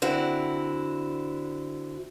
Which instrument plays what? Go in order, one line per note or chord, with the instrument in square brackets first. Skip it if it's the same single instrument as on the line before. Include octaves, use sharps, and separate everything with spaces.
[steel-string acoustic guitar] D3 C4 E4 F#4